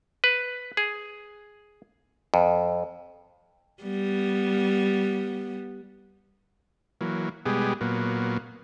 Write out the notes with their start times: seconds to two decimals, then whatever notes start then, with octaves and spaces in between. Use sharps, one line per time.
0.24 B4
0.77 G#4
2.34 F2
3.83 G3 B3
7.01 E3 F#3 A#3
7.46 B2 G3 G#3 B3 G4 G#4
7.81 A#2 F#3 A#3 B3